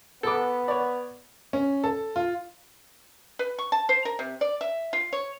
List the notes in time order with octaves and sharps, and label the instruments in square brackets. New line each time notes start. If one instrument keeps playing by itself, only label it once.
[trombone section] B3 [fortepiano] A4 D6
[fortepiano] C#5 D5
[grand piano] C#4
A4
F4
[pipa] B4
C#6
A5
C5
A#4
C3
D5
E5
F4
C#5